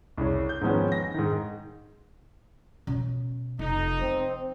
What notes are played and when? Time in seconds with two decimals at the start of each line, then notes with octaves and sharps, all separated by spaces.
0.18 C2 C#3 C#5
0.49 G6
0.61 G#2 D#3 F3 B3 C#4
0.92 A#6
1.14 G#2 D#3
2.87 B2 C#4
3.59 F1 D#4
4.01 F3 C4